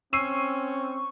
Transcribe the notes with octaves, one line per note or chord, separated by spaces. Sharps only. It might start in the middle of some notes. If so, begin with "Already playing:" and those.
C4 C#4 C#6 E6 C7 D#7